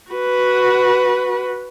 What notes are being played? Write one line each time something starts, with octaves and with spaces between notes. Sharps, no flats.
F#4 B4